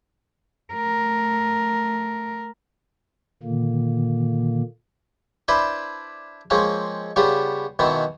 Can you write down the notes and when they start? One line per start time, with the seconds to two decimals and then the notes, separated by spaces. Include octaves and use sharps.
0.73 A3 A#4
3.43 A#2 D3 D#3 A#3
5.48 D4 E4 B4 C5 D5 B5
6.50 F3 G#3 A#3 C4 C#4
7.16 C#3 G3 B3 F4 G4
7.79 B2 D#3 E3 B3 C4